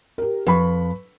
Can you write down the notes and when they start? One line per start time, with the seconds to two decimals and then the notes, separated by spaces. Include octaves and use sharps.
0.18 G4 A#4
0.47 F2 B4 B5 C#6